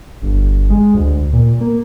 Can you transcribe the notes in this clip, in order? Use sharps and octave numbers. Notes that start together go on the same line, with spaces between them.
G1
G#3
D2
A#2
A#3